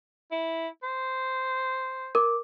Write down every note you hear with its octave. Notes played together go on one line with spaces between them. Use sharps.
E4
C5
A#4 D6